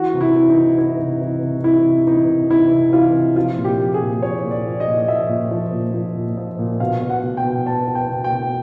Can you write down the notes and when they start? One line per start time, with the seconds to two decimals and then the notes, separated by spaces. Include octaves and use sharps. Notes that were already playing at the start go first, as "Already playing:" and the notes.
Already playing: E3 F#4
0.14 C3
0.21 E4
0.35 E3
0.49 D#4
0.56 C3
0.78 E3 E4
0.99 C3
1.21 E3
1.42 C3
1.64 E3 E4
1.86 C3
2.07 E3 D#4
2.29 C3
2.50 E3 E4
2.71 C3
2.93 E3 F4
3.14 C3
3.36 F3 F4
3.57 A#2
3.65 G4
3.79 F3
3.94 G#4
4.01 A#2
4.22 F3 C#5
4.44 A#2
4.51 D5
4.65 F3
4.80 D#5
4.87 A#2
5.08 F3 E5
5.29 A#2
5.51 F3
5.72 A#2
5.94 F3
6.16 A#2
6.37 F3
6.59 A#2
6.80 B2 F5
7.02 B2
7.10 F#5
7.23 B2
7.37 G5
7.44 B2
7.66 B2 A5
7.88 B2
7.95 G5
8.10 B2
8.24 G5
8.31 B2